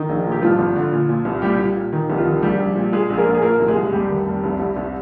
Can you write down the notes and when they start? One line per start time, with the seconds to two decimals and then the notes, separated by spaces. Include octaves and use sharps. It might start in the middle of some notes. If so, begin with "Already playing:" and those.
Already playing: D#3 D#4
0.09 A#1
0.26 A#2
0.32 G4
0.42 G2 F3 F4
0.59 G#1
0.76 D3
0.92 A#2
1.09 A#2
1.25 C2
1.42 A#2 G3 G4
1.59 A#2
1.76 A#2
1.92 D#3 D#4
2.10 C2 G4
2.17 F3 F4
2.26 D#3
2.42 A#1 G3 G4
2.60 A#1
2.75 A#2
2.92 A#2 G#3 G#4
3.10 A#1 G#4
3.17 A#3 A#4
3.26 A#1
3.35 G#4
3.42 A#2 A#3 A#4
3.60 C2
3.68 G#3 G#4
3.76 C2
3.92 F1 G3 G4
4.09 D#3
4.26 F1
4.44 C2
4.60 C2
4.77 C2